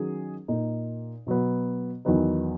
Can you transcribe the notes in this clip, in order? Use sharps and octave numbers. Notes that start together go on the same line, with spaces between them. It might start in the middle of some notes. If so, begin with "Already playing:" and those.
Already playing: D#3 F#3 C#4 G#4
A#2 A#3 D#4
B2 F#3 B3
E2 D#3 F#3 B3 D#4